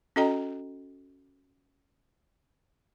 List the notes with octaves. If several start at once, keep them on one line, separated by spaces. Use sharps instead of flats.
C#4 F#4 A4 D#5 G5 A#5